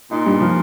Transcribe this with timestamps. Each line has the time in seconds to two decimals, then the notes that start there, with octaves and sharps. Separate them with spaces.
0.11 A#2 D#4
0.26 G2
0.40 F3